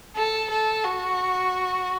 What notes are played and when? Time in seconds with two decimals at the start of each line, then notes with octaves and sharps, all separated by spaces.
0.16 A4
0.51 A4
0.85 F#4